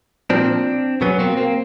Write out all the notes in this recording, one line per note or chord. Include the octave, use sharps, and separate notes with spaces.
A#2 F3 C4 D4
B2 F#3 B3 C#4
A#3 C4
A#3 C4